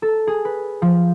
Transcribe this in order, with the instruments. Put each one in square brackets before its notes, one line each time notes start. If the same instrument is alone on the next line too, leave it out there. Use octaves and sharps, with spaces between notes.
[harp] A4
G#4
B4
F3